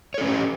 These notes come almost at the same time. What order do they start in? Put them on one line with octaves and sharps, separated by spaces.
C#5 A4 C#4 B4 G4